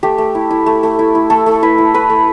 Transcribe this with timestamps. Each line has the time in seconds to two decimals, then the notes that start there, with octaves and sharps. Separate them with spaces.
0.03 A3 G4
0.18 A3
0.35 E4
0.51 E4
0.66 A3
0.83 A3
0.99 E4
1.15 E4
1.30 A3 A4
1.46 A3
1.62 E4 B4
1.78 E4
1.94 A3 B4
2.10 A3